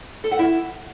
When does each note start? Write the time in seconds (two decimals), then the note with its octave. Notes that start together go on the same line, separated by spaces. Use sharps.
0.24 A4
0.31 F#5
0.39 E4